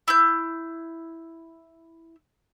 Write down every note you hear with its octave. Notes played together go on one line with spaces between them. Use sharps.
E4 G6